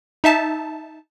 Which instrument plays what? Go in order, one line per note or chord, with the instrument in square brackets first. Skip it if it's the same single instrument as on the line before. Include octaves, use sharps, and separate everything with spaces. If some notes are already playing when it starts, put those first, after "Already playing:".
[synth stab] D#4 E5 A5